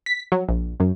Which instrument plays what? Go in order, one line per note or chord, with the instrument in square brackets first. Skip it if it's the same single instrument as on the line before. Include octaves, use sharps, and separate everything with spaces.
[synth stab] B6
F#3
A#1
F#2